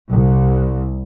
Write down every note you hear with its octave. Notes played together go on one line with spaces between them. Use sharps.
C2